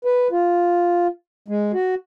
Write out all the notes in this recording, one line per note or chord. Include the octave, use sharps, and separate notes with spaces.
B4
F4
G#3
F#4